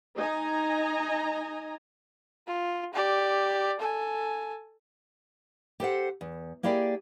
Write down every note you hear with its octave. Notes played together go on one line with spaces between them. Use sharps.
D#4 D#5 G#5 A#5
F4
G4 D5
A4 G#5
G4 A4 C5 F#5
E2
A#3 E4 G4 G#4 D5 G5